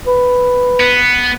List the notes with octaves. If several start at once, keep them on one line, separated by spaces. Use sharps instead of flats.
B4
B3